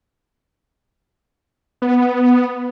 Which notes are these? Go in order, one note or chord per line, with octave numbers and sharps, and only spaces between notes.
B3